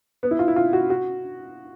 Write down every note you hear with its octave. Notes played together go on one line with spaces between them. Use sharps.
B3
E4
F4
E4
F4
F#4
F#4